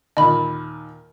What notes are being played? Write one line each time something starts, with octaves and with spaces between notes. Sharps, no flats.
D#2 A#2 D#5 B5